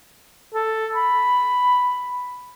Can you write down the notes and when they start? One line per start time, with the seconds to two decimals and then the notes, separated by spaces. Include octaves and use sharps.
0.54 A4
0.96 B5